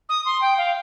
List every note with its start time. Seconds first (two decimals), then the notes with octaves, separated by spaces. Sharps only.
0.09 D#6
0.25 C6
0.41 G5
0.57 F5